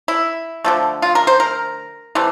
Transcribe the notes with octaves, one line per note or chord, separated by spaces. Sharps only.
E4
D3 F3 A3
F4
A#4
C5
A#4
C3 E3 A3